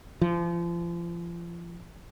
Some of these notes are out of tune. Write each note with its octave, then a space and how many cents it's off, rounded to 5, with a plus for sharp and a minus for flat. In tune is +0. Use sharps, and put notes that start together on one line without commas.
F3 -35